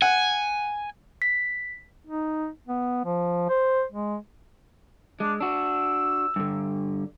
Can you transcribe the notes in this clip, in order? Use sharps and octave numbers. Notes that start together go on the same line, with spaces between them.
F#5 G#5
B6
D#4
B3
F3
C5
G#3
G#3 D4
D4 F#4 E6
G2 D3